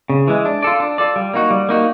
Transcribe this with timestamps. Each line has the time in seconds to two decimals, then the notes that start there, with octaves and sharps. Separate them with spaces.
0.10 C#3
0.28 E3 G#3
0.45 D4
0.63 F4 A4 D5
0.80 D4
0.98 F4 A4 D5
1.16 G3
1.34 A#3 D#4 F#4
1.51 G3
1.69 A#3 D#4 F#4